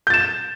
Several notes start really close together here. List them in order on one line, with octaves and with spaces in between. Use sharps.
G6 A6 E7